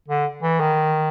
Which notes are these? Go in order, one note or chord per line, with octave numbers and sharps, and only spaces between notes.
D3
E3
D#3